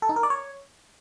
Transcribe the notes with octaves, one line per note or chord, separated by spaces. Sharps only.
A4
D#4
A#4
D5
C#5